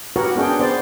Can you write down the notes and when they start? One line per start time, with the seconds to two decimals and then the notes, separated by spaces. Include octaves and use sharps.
0.16 F#4 G4 A#4 B4 C#5 F#5
0.36 B3 C#4 D4 G#4 G5
0.60 B3 C5 D5